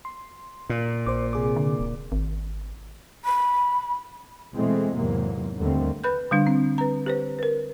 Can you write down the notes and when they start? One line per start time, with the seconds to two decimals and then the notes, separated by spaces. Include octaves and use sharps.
0.05 C6
0.70 A#2
1.06 A#1 C5 D6
1.33 C3 G#4 D6
1.56 D3
1.79 D1
2.12 G#1
3.25 B5
4.54 B2 E3 G#3 A3 C4
4.95 E2 G#2 C3 F#3 A#3
5.58 D#2 D3 G3 A3 A#3 C4
6.04 B4 B5 F#6 G6
6.31 D3 G3 D4
6.47 C4
6.78 B4 A#5
7.06 G4 B4 C5
7.39 A#4 B4